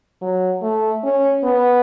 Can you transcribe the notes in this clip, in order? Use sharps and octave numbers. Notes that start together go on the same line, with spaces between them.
F#3
A3
C#4
B3